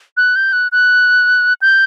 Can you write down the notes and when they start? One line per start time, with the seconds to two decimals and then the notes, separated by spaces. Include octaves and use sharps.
0.17 F#6
0.36 G6
0.53 F#6
0.72 F#6
1.62 G6